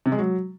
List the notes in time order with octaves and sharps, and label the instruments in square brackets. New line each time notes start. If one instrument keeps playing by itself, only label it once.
[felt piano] C3
G#3
F#3